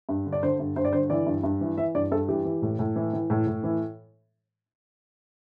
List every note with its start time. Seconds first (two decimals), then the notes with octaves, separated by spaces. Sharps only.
0.09 G2
0.26 D3
0.32 D5
0.43 D3 C5
0.59 G2
0.76 G2 C5
0.85 D5
0.93 D3 C5
1.10 E3 D5
1.26 G2
1.43 G2
1.61 E3
1.78 E3 E5
1.95 G2 D5
2.11 G2 A4
2.28 E3 G4
2.45 E3
2.62 A2
2.79 A2
2.96 E3
3.13 E3
3.30 A2
3.47 A2
3.64 E3